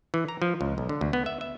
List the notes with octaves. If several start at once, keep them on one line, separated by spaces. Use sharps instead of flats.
E3
A#5
F3
C#2
B1
D3
D2
B3
E5
E5